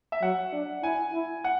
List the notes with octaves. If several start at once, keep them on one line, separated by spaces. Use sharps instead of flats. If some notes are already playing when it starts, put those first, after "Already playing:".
E5
F#3 F#5
D4
E4 G#5
E4
F#5